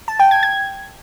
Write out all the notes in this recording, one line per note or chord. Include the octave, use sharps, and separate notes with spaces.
A5
G5
G#6
G#6